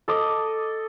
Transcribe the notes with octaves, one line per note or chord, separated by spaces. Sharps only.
A4 D#5 D6